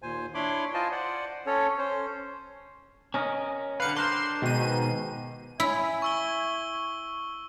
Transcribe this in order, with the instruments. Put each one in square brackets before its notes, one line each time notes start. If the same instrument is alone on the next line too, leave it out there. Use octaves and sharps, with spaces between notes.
[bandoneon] D#2 A#2 C5 G#5
D4 E4 C#5 B5 C6 D6
F4 C5 D#5 G#5 A5
C5 D5 F#5
C#4 A4 C#5
C#4 C5
[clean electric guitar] C#4 A#4 D#5
[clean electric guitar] D3 G3 B4 [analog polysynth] F5 C#7
[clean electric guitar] D4 A#4 C5 [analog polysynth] C6
[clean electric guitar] G#2 D#3 [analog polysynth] B2 D#7
[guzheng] E4 [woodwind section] E5 G#5
[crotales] C#6 E6 G7